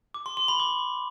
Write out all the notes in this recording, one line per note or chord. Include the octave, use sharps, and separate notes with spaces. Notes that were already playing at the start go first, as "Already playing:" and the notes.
D6
C6
C6
B5
D6